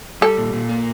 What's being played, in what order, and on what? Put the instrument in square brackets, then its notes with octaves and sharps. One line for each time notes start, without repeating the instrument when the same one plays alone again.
[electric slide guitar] G3 [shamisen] A4
[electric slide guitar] A#2
A#2
A#3